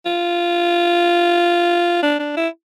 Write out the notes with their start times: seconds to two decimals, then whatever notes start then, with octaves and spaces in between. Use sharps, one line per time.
0.06 F4
2.03 D4
2.19 D4
2.37 E4